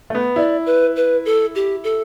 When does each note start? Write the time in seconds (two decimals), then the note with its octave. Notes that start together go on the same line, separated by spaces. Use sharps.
0.10 A3
0.15 B3
0.36 E4 D5
0.66 B4
0.96 B4
1.25 A4
1.55 G4
1.84 A4